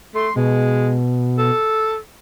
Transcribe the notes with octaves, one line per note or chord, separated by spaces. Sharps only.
A3 C6
B2 G#3
A4